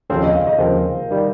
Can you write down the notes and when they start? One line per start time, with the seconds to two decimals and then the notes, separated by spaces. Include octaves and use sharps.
0.10 D#2 C#3 F3 C4 C5
0.22 D#5
0.33 F5
0.46 D#5
0.58 D#2 C#3 F3 C4 A#4
1.10 D#3 G3